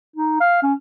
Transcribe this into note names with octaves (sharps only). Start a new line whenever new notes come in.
D#4
F5
C#4